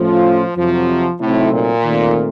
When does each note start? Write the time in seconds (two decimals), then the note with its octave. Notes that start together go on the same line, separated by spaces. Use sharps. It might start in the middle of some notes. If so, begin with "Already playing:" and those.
Already playing: A2 F3 A3 C#4 F4
0.56 F2 C3 F3 F#3
1.20 A2 C3 F#3 A3 C4 D#4
1.53 A#2
1.84 D#3 A3 C4 F4